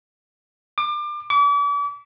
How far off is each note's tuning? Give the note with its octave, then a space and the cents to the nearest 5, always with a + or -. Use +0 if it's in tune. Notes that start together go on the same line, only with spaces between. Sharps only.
D6 +30
D6 -40